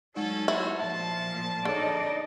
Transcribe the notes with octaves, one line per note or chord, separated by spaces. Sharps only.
F#3 G#3 C#4 D#4 A4 D5
E4 F#4 C5 C#5
A#2 F3 E5 A5
D3 D#4 G#4 C#5 D5